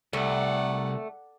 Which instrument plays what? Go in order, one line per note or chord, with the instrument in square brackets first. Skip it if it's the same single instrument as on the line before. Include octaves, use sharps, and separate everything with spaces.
[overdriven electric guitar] C2 [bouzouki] A3 [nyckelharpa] D5 F#5